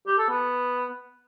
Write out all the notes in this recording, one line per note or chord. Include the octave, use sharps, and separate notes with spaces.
G4
A4
B3